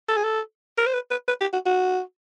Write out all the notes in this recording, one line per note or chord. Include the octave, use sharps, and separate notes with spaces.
A4
G#4
A4
A#4
C5
B4
B4
B4
G4
F#4
F#4